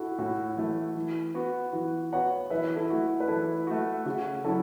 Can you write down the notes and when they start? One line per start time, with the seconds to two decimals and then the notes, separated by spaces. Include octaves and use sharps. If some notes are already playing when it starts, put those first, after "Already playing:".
Already playing: E4 F#4 A4
0.18 A2 F#4
0.56 E3 A3 F#4
0.95 E3
1.34 B3 F#4
1.73 E3 F#4
2.12 B3 F#4 C#5 F#5
2.50 E3 B4 E5
2.76 E4 A4
2.90 A3 F#4
3.20 B4
3.28 E3 E4 A4
3.67 A3 F#4
4.05 C#3 F#4
4.44 F#3 C#4 E4 F#4 A4